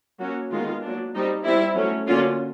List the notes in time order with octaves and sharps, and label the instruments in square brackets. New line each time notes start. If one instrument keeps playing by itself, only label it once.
[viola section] F#3 A#3 C#4 F#4
D#3 G#3 B3 F4
F#3 A#3 D4
G3 C4 D#4
G3 C4 E4
F#3 A3 C#4
D3 F#3 A#3 C#4 F4